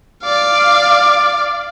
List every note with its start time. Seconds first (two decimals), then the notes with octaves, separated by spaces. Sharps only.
0.23 D5 F5